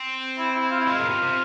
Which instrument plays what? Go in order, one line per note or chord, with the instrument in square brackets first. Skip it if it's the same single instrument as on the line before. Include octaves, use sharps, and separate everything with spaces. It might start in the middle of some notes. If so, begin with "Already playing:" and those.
Already playing: [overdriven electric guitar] C4
[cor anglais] E4
E4
F4
E4
[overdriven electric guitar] G#3 [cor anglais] F4
[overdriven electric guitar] A#2
C3
C3